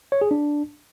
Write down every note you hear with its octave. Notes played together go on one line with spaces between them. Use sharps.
C#5
G#4
D4